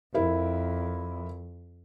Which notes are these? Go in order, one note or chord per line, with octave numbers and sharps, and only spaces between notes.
F2 E4 A#4